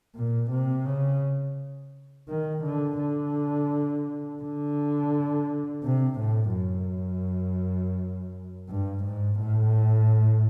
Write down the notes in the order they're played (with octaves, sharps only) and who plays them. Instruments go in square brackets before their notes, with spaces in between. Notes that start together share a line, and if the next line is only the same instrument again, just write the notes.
[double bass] A#2
C3
C#3
D#3
D3
D3
D3
C3
A2
F#2
G2
G#2
A2